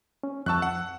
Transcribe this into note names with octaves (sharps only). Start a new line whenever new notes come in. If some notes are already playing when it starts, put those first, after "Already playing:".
C#4
F2 A5 C#6 E6 F#6
F#5